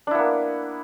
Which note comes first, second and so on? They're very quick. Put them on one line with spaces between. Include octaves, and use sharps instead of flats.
D4 E4 B3 A#3